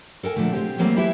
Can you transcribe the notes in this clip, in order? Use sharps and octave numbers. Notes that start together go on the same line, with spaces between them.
A4 A#4 F#5 G#5
A#2 D3 F3 A3
G#3 C4 G4 G#4
E3 F#3 G3 A3 A#3 C4
G#3 E4 G4 B4 E5